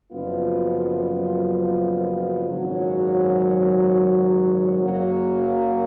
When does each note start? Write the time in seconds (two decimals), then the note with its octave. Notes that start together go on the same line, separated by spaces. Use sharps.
0.12 F#1 F#2 F3 B3 F4
2.47 G#1 F#2 C#3 F#3
4.82 F#1 F#2 C#3 F#3 A#3